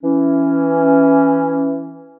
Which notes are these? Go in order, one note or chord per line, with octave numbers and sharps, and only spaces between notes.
E3 C#4